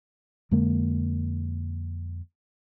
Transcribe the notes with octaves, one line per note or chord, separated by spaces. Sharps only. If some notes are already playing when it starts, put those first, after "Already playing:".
F2 D3 G#3 A#3